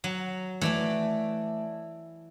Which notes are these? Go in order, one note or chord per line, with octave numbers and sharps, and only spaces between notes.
F#3
E3 A3 D5 A5